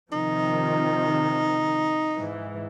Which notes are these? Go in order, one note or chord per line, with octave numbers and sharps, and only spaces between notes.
C3 D#3 F3 D#4
G#2 E3